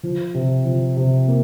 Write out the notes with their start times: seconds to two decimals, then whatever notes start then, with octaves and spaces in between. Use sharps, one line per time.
0.03 F3
0.35 C3
0.65 F3
0.97 C3
1.28 A#3